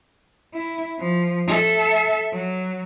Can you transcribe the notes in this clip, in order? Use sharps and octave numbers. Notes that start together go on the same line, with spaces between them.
E4
F3
A4 E5
F#3